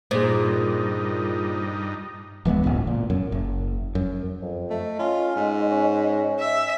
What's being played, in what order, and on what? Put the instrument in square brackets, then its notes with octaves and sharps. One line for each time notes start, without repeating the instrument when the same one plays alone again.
[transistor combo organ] G2 D#4 [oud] A#2 [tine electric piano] G#4 C5
[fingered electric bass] D1 E3 G#3 B3
F#1 C#2 A2 B3
A#2
F#2
F#1
F#2
[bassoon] F2
[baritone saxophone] A3 [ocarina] D#5
[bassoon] C#4 [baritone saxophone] F4
[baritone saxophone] G#2
[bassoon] C#4
[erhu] E5